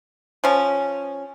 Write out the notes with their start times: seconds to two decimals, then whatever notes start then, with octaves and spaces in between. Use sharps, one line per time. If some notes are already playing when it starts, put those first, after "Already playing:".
0.44 F3 C#4